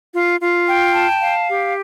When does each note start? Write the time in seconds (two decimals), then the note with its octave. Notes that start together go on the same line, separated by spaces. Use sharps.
0.14 F4
0.41 F4
0.67 G5
0.94 A5
1.20 F5
1.47 G4